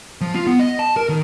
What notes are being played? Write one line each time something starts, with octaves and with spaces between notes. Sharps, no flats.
F3
F4
B3
D#5
A5
A#4
D#3